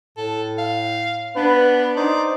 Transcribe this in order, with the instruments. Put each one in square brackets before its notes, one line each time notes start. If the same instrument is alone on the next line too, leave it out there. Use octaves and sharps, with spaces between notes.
[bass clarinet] A2 [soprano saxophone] A4
[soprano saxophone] F5
[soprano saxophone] B3 [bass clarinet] D4 [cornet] B4
[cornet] D#4 [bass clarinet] C5 [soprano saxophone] D5